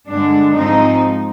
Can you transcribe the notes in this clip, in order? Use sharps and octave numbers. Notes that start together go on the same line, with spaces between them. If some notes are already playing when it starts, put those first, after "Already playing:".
G2 D3 G#3 D4
G#2 F3 G#3 C4 D#4